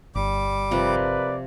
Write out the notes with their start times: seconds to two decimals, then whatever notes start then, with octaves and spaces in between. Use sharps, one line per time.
0.15 G1 G3 D6
0.71 C3 F3 A#4 B4 D5